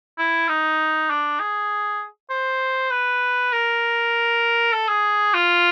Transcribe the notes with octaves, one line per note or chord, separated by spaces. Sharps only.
E4
D#4
D4
G#4
C5
B4
A#4
A4
G#4
F4